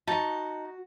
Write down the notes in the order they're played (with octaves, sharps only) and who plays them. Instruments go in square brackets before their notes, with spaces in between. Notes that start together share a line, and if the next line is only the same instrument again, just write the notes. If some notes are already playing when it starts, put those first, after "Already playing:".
[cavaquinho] D#4 A5 [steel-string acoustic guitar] F#4